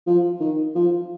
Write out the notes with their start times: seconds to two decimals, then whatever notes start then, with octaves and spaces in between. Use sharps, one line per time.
0.07 F3
0.40 D#3
0.75 F3